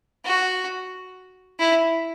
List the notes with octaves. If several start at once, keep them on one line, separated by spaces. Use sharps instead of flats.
F#4
E4